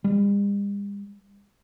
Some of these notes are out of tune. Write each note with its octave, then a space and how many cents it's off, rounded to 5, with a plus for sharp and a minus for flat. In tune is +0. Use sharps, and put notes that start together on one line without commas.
G3 +45